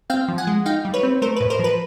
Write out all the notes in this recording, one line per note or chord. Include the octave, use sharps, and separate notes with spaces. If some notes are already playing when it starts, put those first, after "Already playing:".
C4 F5 G5
F3
F#5 G#5
G#3
D#4 F5 G5
G3
B4 C#5
C4
A3 A#4 C5
B4
A2
A#4 C5
F3 B4